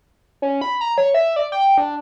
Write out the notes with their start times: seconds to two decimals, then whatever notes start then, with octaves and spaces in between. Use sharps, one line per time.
0.42 C#4
0.61 B5
0.81 A#5
0.98 C#5
1.14 E5
1.36 D5
1.52 G5
1.78 D4